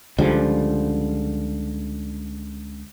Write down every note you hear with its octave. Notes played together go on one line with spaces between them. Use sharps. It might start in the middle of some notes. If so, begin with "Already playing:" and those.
C#2 D3 F3 G3